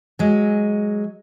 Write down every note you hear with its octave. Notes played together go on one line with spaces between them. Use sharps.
F#3 G#3